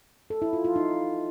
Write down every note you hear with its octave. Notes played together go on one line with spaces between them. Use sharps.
A4
E4
F4
F4
D#4